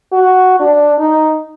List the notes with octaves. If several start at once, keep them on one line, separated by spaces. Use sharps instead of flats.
F#4
D4
D#4